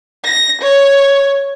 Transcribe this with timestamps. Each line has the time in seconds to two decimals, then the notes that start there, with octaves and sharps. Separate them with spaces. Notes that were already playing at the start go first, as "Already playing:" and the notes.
0.24 A#6
0.61 C#5